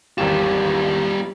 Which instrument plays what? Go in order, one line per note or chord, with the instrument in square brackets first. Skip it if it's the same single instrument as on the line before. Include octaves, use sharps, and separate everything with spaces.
[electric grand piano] G#1 E2 E7 [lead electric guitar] G3 F4 [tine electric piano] G4 A#4